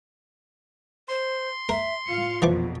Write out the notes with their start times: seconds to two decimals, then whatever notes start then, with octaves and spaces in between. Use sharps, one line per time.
1.08 C5 C6
1.69 A#4 E5
2.08 A2 F4 F5 C#7
2.42 A#1 F2 B2 E3 F3 D6